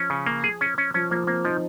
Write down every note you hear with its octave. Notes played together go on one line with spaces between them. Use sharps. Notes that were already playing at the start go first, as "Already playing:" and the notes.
Already playing: F3 C#4
C#3
A#3
G#4
C#4
C#4
F3 C#4
F3 A#3
A#3 C4
F3 D#4